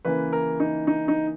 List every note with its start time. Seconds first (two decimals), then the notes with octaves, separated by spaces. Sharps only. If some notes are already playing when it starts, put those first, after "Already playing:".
0.05 C#3 E3 A#3 B4
0.33 A#4
0.60 D#4
0.87 D#4
1.08 D#4